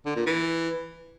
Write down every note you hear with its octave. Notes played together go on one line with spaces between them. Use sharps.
D3
A#2
E3